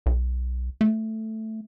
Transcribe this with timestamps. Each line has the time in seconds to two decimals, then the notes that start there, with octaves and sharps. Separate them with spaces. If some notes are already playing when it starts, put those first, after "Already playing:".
0.06 B1
0.81 A3